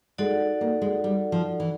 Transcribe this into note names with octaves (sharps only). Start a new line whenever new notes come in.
G#3 D#4 F#4 A4 D5 F#5
A#3
G#3
G3
F3
E3